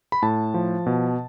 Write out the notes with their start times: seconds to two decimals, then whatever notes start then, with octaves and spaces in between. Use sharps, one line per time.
0.12 B5
0.22 A2 A5
0.54 F3
0.86 B2